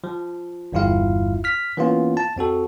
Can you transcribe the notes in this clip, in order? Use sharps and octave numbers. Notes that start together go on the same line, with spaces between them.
F3
G1 E2 G2 E4 F4 F5
F6 B6
E3 A#3 B3 C#4 F4
A5
F2 C4 F#4 A4